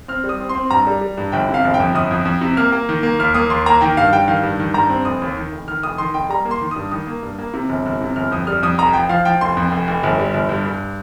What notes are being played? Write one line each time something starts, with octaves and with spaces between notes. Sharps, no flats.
C4 F6
G3
D#6
C4
C6
C4
G2 A#5
G3
G3
G2
G1 G5
C3
F5
G1
G5
F2
G1 D#6
F2
F2
C3
A#3 F6
A#3
D#3
A#3
D#2 F6
A#3 D#6
D#2 C6
A#3 A#5
D#3 G5
G2 F5
G2 G5
D#3 F5
G2
D#3
G2 A#5
C4
F1 D#6
D#2
D#3
F1
D#3 F6
F1 D#6
D#3 C6
F1 G5
G3 A#5
A#3
C6
D#3
G2 D#6
D#3 D#6
A#3
G2
A#3
C3
G1
G1
C3
G1 F6
F2 D#6
G3 F6
F2 D#6
F1 A#5
F3 G5
F3 F5
F3 G5
F1 C6
F2
F1
F1
G1
G3
G1
G2
G2